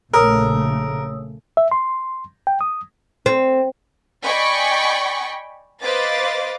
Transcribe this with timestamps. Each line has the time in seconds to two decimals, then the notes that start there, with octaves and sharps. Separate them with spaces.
0.13 A#1 C#3 A3 A#4 C#5 D#6 E6
1.57 E5
1.71 C6
2.47 G5
2.61 D#6
3.26 C4
4.25 D5 D#5 G5 G#5 B5 C#6
5.82 B4 C5 D#5 F5 D6 A6